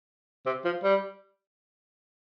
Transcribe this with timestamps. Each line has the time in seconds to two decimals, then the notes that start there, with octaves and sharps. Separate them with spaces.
0.46 C3
0.65 F3
0.84 G3